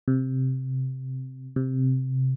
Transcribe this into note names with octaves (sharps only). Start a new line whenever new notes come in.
C3
C3